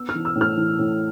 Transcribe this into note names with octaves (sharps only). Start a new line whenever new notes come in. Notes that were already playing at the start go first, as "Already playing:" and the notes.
Already playing: B3 E6
F6
E3
E6
A2
F6
E3
A2